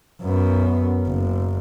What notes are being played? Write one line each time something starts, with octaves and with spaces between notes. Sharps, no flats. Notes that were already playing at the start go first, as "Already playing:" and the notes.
F#2 B3
F#1